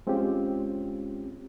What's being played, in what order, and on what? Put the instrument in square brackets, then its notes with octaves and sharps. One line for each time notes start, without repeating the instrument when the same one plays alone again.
[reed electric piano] G#3 C4 C#4 F4 G4